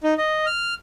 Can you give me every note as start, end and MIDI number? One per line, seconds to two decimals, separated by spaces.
0.04 0.14 63
0.18 0.46 75
0.46 0.74 89